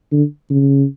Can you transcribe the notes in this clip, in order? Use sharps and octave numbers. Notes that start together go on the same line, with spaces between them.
D3
C#3